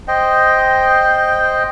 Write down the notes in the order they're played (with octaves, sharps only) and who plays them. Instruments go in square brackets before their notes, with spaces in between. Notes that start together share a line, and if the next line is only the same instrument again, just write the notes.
[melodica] C5 D#5 G5